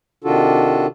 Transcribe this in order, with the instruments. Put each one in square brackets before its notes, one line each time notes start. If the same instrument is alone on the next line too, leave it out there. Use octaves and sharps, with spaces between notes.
[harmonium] C3 D#3 D4 F4 F#4 A4